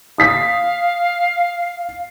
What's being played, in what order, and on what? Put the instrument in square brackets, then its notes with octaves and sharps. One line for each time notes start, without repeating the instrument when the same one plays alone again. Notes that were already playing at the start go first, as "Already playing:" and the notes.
[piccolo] F5 [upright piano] D#6 B6